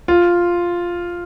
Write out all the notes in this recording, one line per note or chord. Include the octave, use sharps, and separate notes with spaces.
F4